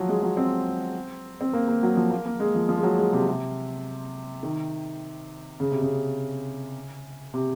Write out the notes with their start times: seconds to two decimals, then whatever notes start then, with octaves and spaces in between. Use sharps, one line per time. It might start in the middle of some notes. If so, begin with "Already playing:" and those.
Already playing: F3 F#3
0.09 G#3
0.23 F#3
0.37 C4
1.41 C4
1.53 A#3
1.68 A#3
1.83 F#3
1.96 F3
2.11 A#3
2.26 A#3
2.40 G#3
2.55 F3
2.69 F3
2.77 G#3
2.83 F#3
2.98 G#3
3.13 C3
3.28 C3
4.43 D#3
5.60 C#3
5.71 C3
5.82 C#3
7.34 C3